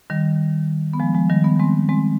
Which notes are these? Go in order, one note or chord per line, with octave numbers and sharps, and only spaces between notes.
D#3 G3
B3
F3 G#3
F3 G#3
D#3 G3
G3 B3
G#3 C4
G#3 C4